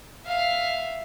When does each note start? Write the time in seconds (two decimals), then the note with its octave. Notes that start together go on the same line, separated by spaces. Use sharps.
0.24 E5 F5